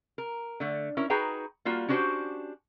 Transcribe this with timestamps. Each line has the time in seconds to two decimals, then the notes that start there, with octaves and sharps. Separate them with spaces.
0.18 A#4
0.60 D3 A3
0.97 C#4 E4 A#4
1.10 D#4 F#4 G#4 B4 G5 A#5
1.65 G3 A#3 F4 F#4
1.88 C#4 D4 F#4 G4 C5